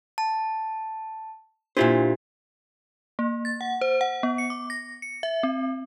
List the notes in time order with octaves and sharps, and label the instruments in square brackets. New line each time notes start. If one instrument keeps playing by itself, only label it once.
[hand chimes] A5
[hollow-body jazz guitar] A#2 E4 C5 [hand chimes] D4 F4 G4
[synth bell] A#3
A6
F#5
C5
F#5
B3
C#7
D6
A#6
C#7
E5
C4